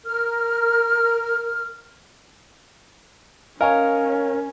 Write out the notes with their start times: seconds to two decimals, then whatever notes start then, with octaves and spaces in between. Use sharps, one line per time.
0.05 A#4 F6
3.61 C#4 A#4 C#5 D#5 F5 G#5